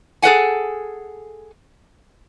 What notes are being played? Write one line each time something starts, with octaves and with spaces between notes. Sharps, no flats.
G#4 A4 B4 E5 F#5 G#5